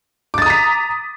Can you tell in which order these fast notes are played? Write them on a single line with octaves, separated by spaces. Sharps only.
D6 A6 D#6 A#5 B6